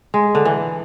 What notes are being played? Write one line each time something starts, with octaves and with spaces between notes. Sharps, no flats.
G#3
D3
E3